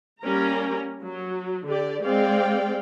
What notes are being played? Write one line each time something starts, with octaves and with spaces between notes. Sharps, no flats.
G3 A#3 C#4 A#4 A#5
F#3
D3 G4 D5
G#3 C4 D5 F5 G5